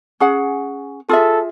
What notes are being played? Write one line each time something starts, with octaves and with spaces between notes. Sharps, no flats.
C#4 G#4 F#5
F4 G#4 A4 E5